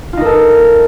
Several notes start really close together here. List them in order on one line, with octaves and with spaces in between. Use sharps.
F4 D#4 A#4 A4